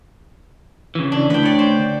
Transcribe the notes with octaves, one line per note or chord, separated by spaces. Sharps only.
C#3 E3
D4
D2 B4 G5
C#5 D5
C5